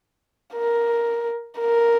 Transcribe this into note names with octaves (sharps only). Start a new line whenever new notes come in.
A#4
A#4